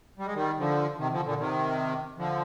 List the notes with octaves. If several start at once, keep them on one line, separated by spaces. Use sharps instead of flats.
G3
G#3
D#3 G3
D3 F3
C3 D#3
D3 F3
A#2 D3
C3 D#3
D3 F3